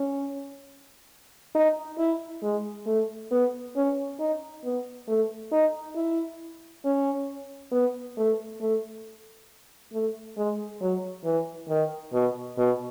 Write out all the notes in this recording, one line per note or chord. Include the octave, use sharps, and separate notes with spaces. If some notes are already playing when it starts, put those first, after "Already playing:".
Already playing: C#4
D#4
E4
G#3
A3
B3
C#4
D#4
B3
A3
D#4
E4
C#4
B3
A3
A3
A3
G#3
F#3
E3
D#3
B2
B2